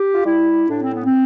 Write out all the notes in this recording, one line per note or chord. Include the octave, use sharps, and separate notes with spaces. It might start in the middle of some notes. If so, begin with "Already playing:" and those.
Already playing: G4
F4
G3 E4
A2 D4
C4
B3
C4